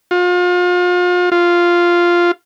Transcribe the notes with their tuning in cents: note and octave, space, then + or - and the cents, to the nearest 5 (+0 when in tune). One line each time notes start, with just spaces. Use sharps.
F4 +35
F4 -5